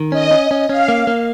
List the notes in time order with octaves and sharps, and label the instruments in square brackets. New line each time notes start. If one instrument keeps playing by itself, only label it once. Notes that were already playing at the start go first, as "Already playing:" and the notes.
Already playing: [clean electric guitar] D#3
[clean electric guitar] C#4 [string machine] D#5
[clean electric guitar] C#4
C#4
[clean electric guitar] C#4 [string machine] F5
[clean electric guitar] A#3
A#3